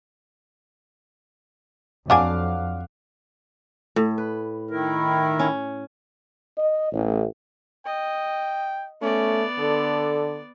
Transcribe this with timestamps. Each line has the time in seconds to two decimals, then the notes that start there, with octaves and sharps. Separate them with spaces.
2.10 F2 F#3 D4 F5 F#5 G#5 D6
3.96 A2
4.18 B4
4.71 D#3 E4 A#4
5.39 C#4
6.58 D#5
6.92 A1
7.86 D#5 G5
9.02 A3 B3 C#4 D5
9.59 D3 A4